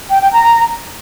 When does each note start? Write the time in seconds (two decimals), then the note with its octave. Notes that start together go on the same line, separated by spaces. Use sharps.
0.09 G5
0.21 G5
0.32 A#5